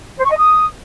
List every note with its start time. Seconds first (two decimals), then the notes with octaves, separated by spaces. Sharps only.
0.17 C5
0.24 C#6
0.31 D#5
0.37 D#6